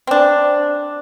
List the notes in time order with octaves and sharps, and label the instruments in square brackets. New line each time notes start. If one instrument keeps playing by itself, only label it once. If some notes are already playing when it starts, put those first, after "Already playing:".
[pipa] C4 D4